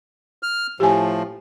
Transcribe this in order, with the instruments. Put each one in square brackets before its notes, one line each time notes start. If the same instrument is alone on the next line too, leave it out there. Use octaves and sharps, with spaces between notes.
[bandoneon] F6
[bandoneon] A2 F3 [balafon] G4 G#5